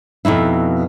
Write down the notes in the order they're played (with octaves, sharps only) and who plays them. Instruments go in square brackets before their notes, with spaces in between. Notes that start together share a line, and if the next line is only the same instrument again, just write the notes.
[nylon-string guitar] F2 B2 D#4 E4